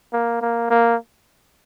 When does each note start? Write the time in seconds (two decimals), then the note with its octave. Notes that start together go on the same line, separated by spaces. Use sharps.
0.13 A#3
0.41 A#3
0.70 A#3